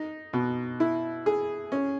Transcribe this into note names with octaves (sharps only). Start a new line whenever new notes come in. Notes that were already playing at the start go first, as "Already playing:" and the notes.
Already playing: D#4
B2
E4
G#4
C#4